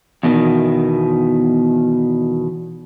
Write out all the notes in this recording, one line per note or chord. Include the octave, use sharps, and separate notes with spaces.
E2 B2 D#3